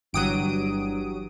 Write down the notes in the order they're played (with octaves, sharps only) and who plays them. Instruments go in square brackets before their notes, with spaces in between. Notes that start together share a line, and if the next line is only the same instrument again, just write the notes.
[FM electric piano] G1 E3 G4 [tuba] G2 [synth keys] F#3 D#6 D7